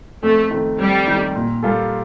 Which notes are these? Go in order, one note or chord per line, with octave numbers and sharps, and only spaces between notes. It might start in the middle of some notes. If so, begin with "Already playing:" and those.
F2 A3
D#3 A3
F2 G3
D#3 A3
A#2
G3 A#3 F4 A4